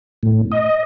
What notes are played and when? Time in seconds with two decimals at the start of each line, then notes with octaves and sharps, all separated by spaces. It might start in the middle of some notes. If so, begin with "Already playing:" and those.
0.23 A2
0.52 D#5